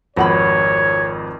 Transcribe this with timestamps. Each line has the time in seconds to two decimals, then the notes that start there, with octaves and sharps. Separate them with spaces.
0.16 G#1 F2 F#4 B4 C#5 F#5 B5